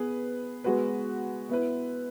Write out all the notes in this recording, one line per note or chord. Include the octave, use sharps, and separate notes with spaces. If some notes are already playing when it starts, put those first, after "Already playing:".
Already playing: B3 G#4 B4
G#3 B3 F#4 B4
B3 E4 B4